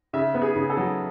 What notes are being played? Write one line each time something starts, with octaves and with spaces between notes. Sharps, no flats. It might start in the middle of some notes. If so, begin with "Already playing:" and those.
C#3 E5
B3
G#4
C#3
A4
F#3